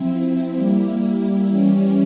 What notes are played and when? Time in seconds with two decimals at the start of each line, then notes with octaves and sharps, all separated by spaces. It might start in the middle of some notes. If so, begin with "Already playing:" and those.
Already playing: F3 C4 E4
0.54 G3 A#3 E4
1.47 E3 G3 C#4